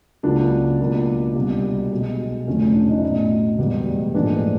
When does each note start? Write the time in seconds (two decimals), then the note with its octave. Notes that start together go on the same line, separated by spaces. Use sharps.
0.23 C#2 C#3 F#3 A#3 D4
0.80 C#2 B2 F#3 A#3
1.35 C2 B2 G3
1.92 B1 B2 G#3
2.47 F1 F2 D3 F#3 A3 C#4
2.61 C#4
2.74 D4
2.89 D#4
2.99 E4
3.03 B1 A2 F#3 D#4
3.58 E1 E2 B2 G3
4.14 A#1 G#2 E3 A3 D4